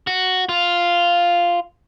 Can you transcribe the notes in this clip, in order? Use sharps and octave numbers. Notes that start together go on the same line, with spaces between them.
F#4
F4